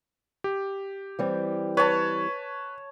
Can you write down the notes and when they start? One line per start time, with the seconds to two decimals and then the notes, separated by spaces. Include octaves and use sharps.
0.44 G4
1.19 E3 G3 C4
1.77 B4 C#5 A5